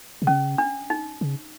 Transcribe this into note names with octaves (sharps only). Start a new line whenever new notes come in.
C3
C#3 C#4
D4
D#4
C#3